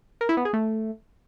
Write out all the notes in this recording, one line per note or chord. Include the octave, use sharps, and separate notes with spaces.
A#4
E4
B3
G#4
A3